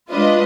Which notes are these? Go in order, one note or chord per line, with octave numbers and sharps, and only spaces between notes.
G#3 D4 F4 B4 D#5